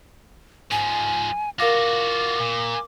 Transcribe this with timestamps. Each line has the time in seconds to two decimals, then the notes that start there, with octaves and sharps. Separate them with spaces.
0.71 G#2 F3 G#5
1.59 F4 F#4 A#4 F5 D6 A#6
2.40 A#2